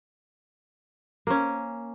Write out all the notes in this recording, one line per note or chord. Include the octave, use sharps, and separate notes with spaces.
A#3 C#4